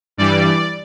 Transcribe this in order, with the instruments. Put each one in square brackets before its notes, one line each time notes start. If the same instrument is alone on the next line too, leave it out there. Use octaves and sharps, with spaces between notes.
[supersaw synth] G2 E3 G3 D5